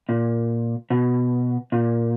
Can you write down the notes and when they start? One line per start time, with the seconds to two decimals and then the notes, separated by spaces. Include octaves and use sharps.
0.09 A#2
0.90 B2
1.72 A#2